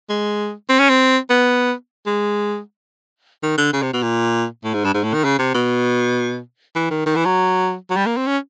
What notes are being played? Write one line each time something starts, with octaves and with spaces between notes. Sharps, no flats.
G#3
C4
C#4
C4
B3
G#3
D#3
D3
C#3
C3
B2
A#2
A2
G#2
G2
G#2
A2
D#3
C#3
C3
B2
E3
D#3
D#3
E3
F#3
F#3
G3
A#3
C4
C#4